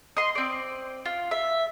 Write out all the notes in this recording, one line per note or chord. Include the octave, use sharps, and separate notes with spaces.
D#5 C6
C4 D5
F4
E5